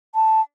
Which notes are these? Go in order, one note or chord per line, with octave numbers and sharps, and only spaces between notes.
A5